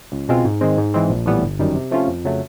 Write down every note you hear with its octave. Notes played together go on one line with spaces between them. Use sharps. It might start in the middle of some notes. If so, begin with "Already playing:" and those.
C#2
B2 G#3 C4 F4
G#2
D#3 G#3 C4
G#2
E3 G#3 C4
A#1
A2 E3 G3 B3
G1
F#2 D#3 G3
C3
F3 A3 C#4 F4
F2
C#3 F#3 A3